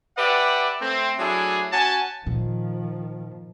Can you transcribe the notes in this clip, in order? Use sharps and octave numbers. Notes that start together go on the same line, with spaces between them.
G4 B4 D5 E5 F#5
A3 C4
F#3 A3 D4 E4 G#4
C#4 F#4 G#5 A5
A#2 D#3 F3